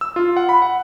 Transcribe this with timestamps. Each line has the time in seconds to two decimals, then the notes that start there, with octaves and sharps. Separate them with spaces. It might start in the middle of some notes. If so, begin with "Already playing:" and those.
0.01 E6
0.16 F4
0.37 F#5
0.49 B5
0.62 F#5